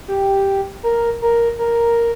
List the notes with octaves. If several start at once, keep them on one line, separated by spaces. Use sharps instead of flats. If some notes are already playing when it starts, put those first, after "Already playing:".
G4
A#4
A#4
A#4